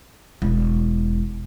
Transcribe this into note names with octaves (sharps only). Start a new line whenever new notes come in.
E1